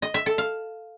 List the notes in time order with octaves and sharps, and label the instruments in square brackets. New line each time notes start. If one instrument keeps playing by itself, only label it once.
[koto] D#5
E5
A4
F5